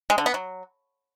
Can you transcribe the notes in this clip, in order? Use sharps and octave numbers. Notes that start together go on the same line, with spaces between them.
G#3
D3
B3
F#3